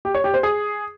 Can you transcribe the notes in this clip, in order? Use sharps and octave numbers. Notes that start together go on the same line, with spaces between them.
G4
C#5
G4
C5
G#4